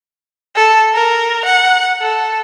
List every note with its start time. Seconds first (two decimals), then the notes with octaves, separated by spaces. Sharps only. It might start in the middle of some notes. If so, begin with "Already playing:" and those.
0.56 A4
0.94 A#4
1.45 F#5
2.02 A4